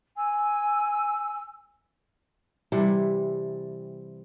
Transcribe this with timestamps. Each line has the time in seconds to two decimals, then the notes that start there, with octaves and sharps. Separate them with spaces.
0.15 G#5 E6
2.72 C3 E3 G3